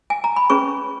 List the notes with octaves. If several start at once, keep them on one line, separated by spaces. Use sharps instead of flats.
G#5
A#5
B5
C#4 G#4 B4 C#6